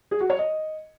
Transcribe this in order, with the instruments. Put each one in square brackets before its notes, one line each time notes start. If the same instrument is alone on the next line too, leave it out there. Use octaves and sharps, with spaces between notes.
[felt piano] G#4
F#4
C#5
D#5